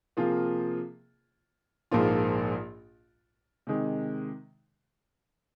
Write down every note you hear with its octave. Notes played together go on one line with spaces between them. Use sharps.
C3 F3 A#3 F4 G#4
A#1 G#2 F3 A#3 F4
C3 D#3 G#3